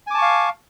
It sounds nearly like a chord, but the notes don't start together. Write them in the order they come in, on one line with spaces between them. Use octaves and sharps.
G#5 D6 A5 C#6 F5